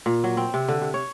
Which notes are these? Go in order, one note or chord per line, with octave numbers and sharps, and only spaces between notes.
A#2
F#3
C4
C3
D3
C3
C#5